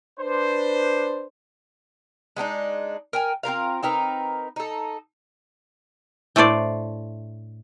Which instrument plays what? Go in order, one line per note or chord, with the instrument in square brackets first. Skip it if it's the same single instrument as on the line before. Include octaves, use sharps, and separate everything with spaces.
[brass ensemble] D4 B4 C5
[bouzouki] G#3 B3 D4 D#4
A#4 G5 G#5
C4 F4 A#4 F5
C4 D#4 A#4 B4
D#4 A4
[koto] A2 A3 D4 C5 D5